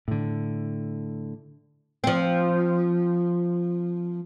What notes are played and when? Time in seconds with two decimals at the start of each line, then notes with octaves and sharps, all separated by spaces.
0.08 A2 D3
2.04 F3 C4